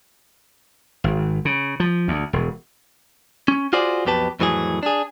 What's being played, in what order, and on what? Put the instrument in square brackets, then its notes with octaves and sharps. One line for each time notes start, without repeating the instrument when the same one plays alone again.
[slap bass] G#1
C#3
F3
D2
E1
[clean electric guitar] C#4
F4 F#4 G#4 C5 D5
B1 F2 B2 G4 B4 A5
F2 A2 E3 F#3 G#4
D4 G#4